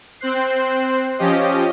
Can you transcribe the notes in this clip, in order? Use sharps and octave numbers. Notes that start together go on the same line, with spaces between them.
C4 C5 F#6 C7
F3 C#4 G4 D#5